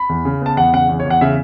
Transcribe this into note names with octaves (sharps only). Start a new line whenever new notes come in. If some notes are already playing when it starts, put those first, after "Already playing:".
Already playing: B5
E2
C#3
B3 A5
E2 F#5
C#3 F#5
E2
C#5
E2
F#5
C#3 E5